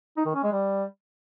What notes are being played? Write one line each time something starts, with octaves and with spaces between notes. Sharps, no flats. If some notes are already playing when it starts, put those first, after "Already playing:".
D#4
D#3
C#4
G#3
G3